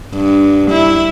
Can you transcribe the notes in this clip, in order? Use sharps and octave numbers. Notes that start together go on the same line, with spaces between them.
G2
E4